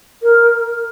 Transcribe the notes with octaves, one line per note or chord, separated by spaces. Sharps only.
A#4